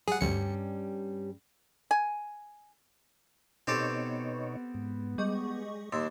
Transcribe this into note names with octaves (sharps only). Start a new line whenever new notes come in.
G3 G#4 F#5
D2 G2 G3 C#4 C#7
G#5
B2 B3 C4 D#4 G4 A4 C#5
G#2
G3 G#3 D#5 C#6
D#2 C6 D6 E6